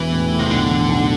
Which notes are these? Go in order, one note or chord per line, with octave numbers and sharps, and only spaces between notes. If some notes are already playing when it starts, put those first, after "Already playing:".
Already playing: E1 E3
A2
A2
C3
B1 D3
E3
B1